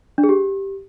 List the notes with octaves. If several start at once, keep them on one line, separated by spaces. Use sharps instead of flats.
D4
G#4
G4